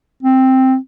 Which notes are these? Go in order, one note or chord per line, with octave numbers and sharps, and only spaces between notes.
C4